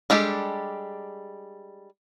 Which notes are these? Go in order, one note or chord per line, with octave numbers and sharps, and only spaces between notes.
G3 G#3 D4 G4 A4